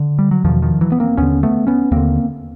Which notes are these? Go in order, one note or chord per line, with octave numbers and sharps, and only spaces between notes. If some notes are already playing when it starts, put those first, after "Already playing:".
Already playing: D3
G3
F#3
E2 B2 D#3 F3
D#3 F3
E3 F#3
B3
A#3 C4
D#2 D3 B3 C#4
A3 B3
B3 C#4
D#2 D3 A#3 C4